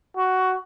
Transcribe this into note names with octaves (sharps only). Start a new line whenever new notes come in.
F#4